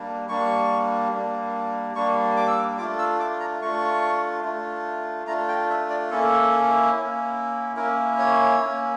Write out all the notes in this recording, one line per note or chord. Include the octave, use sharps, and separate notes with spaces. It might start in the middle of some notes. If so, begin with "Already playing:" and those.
Already playing: G3 A#3 D4
G3 A#3 D4 C#6
G3 A#3 D4
G3 A#3 D4 C#6
D6
E6
D6
A3 D4 F4 D6
E6
D6
A#5
A3 D4 F4 C#6
A3 D4 F4
A3 D4 F4 A#5
G5
E5
D5
A#3 C#4 E4 A4
A#3 C#4 E4
A#3 C#4 E4 A#4
C#5
A#3 C#4 E4